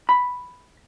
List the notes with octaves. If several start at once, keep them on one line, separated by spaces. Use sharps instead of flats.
B5